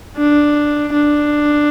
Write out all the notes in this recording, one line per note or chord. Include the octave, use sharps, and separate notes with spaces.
D4
D4